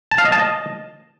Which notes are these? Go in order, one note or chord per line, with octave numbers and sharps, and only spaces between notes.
A5
F5
D#5
A5
D#5